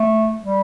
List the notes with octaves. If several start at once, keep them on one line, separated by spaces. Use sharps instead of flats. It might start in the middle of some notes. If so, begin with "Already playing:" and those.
Already playing: A3
G3